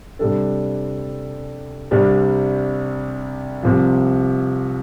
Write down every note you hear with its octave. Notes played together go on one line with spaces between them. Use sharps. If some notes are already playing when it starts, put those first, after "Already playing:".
C3 G3 D4 A4
C2 C3 G3 D4
C2 C3 F3